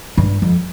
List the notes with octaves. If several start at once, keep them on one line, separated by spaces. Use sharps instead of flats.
G2
F2